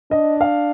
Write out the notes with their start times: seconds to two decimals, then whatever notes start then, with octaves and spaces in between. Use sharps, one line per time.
0.11 D4 D#5
0.41 F5